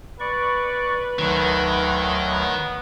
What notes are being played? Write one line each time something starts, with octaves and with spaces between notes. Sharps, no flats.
B4 D5 C#6
D2 D#3 F#3
B3